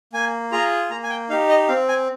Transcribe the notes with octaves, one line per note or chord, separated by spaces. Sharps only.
A#3 G#5
F4 G#4 A#5
A#3 A#5
G#5
G5
D#4 G4 F5
D#5
C4 F5
G#5